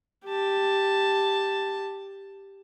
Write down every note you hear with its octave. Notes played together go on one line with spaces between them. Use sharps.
G4 A5